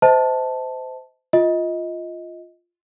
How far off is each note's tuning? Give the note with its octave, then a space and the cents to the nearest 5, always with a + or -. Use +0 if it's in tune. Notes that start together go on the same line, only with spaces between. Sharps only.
C5 -30 D#5 +35 A5 +0
F4 +0 D#5 +20